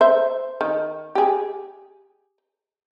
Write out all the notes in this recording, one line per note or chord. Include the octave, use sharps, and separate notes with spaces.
C5 E5
D#3
G4 G#4